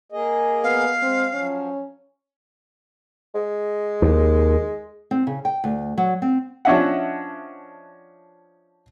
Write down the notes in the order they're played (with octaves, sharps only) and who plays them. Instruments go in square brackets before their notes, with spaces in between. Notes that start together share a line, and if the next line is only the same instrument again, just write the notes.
[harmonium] A#3 G#4 D#5
[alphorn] B3 [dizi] F5
[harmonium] G#3 [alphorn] C4
[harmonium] F3 F#3 [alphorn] C#4
[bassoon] G#3
[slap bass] D#2
[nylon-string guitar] C4
C#3
G5
D2
F#3
C4
[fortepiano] F3 C#4 D4 D#5 E5 F#5